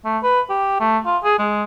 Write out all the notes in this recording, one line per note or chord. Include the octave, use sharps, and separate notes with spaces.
A3
B4
G4
A3
F4
G#4
G#3